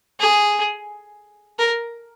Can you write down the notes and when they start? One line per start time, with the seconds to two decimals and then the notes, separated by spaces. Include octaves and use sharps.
0.20 G#4
1.59 A#4